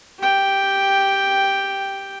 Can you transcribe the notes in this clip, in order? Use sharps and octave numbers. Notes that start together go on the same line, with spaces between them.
G4 G5